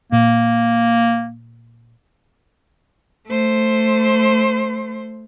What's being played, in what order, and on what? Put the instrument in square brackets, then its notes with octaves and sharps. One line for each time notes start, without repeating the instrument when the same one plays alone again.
[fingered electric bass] A#2 [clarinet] A#3
[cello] A3 C5